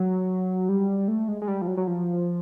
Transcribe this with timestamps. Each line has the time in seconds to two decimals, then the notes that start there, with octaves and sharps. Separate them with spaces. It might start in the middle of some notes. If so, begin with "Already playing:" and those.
Already playing: F#3
0.69 G3
1.08 A3
1.28 G#3
1.42 G#3
1.48 G3
1.62 F3
1.67 F#3
1.77 F#3
1.87 F3